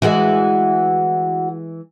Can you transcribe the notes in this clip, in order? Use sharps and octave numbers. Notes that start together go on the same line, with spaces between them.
D2 E3 G#3 F#4 F#5